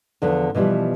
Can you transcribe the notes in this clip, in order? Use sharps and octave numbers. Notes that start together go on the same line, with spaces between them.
E2 D3 F3
B2 E3 F3 G3